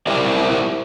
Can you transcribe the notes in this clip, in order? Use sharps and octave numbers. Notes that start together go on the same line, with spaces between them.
E4 G4 A#4 C5 D5 E5